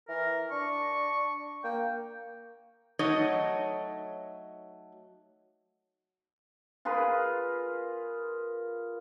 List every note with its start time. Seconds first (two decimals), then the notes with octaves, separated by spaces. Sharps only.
0.09 E3 A#4
0.51 D4 C#6
1.64 A#3 G5
2.99 F#3 A3 D#4 C#5 D#5
6.85 F4 G#4 A#4 B4